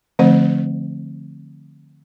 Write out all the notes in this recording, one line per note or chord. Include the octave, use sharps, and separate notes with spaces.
D3 F3 A3 C4 C5